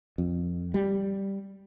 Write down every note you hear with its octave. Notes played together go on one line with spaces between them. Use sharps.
F2
G3